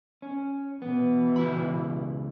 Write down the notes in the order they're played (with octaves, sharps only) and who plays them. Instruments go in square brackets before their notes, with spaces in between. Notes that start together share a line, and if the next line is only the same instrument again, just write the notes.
[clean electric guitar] C#4
[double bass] B2 E3 [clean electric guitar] B3
[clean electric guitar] C#2 E4 B5